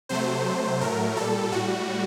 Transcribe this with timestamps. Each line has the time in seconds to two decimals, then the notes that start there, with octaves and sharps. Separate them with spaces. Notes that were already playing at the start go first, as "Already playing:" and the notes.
0.09 C3 F#3 A3 C5
0.45 C3 F#3 A3
0.81 A2 F#3 A3 A#4
1.17 A#2 G3 A4
1.52 A2 G3 F#4